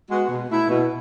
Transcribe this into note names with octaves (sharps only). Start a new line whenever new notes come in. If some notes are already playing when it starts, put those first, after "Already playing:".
G#3 B3 F#4
B2
A3 E4
B2